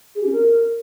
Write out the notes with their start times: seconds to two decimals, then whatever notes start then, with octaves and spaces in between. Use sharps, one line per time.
0.15 G#4
0.21 G4
0.26 C#4
0.31 A#4